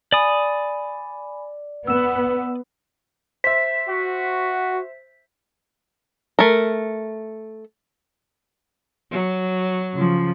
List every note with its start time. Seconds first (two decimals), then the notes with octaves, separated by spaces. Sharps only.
0.12 D5 G#5 B5 D#6
1.87 B3 E6 E7
3.44 C5 E5 B6
3.88 F#4
6.39 A3 A#4
9.11 F#3
9.95 C#3 F3